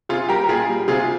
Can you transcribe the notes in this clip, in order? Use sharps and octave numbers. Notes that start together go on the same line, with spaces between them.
C3 F4 G#4
G3 G4 A#4
A#4
A#2 F4 G#4
G3
C3 F4 G#4